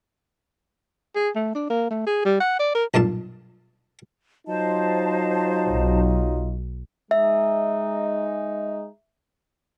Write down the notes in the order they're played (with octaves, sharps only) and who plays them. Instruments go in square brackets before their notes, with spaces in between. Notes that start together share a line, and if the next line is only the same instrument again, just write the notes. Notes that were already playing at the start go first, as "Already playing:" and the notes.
[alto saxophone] G#4
A3
D4
A#3
A3
G#4
G3
F#5
D5
A#4
[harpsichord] B1 G2 A#2 A5
[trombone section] F#3 D#4 F4 [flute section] C5 D#5 A5
[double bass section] B1
[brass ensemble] G#3 D#4 [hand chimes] E5